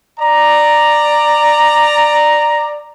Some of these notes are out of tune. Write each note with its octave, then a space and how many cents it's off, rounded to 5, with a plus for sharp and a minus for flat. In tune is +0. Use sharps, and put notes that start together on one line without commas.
D5 +10 A#5 +0